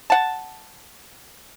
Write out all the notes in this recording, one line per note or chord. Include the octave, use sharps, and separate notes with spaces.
F#5 A5